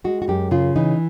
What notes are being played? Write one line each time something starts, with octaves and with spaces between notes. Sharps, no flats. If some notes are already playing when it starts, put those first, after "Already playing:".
G#3 F#4
F#4
F#2 G4
C#3 F4
E3 D#4